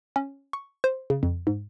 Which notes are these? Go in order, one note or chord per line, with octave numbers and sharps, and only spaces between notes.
C#4
C#6
C5
C#3
F2
G#2